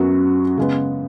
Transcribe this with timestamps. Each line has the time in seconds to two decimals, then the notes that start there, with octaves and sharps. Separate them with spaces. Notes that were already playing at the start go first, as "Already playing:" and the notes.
Already playing: F#2 F#3 B3 F#4
0.58 C#3 G#3 B3